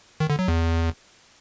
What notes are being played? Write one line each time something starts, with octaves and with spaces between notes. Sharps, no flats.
D#3
D3
F#3
E2